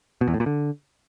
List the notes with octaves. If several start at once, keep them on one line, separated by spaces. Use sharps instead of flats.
B2
E2
A2
A#2
D3